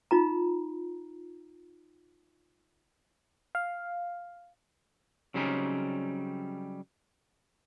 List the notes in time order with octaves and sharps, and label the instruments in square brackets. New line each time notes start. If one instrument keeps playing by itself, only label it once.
[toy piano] D#4 F4 A#5
[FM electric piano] F5
[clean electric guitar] C#3 F#3 G3 C4 C#4 D#4